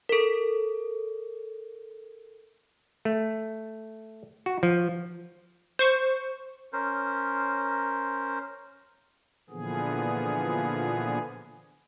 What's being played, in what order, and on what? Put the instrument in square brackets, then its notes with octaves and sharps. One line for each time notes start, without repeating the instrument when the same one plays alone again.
[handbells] A4 A#4
[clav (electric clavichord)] A3
F#4
F3
[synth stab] C5 C#6
[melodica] C#4 A#4 C5
[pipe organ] A#2 D3 E3 F3 B3 G#4